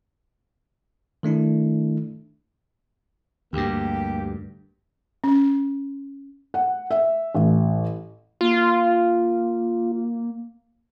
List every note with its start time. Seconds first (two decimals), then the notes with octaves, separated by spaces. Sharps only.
1.23 D#3 A3 D4 E4
3.53 D2 G2 A#3 G4
5.24 C#4
6.54 F#5
6.91 E5
7.35 A1
8.41 A#3 F4